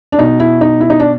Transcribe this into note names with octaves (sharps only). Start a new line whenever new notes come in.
D4
B2 D#4
E4
D#4
E4
D#4
D4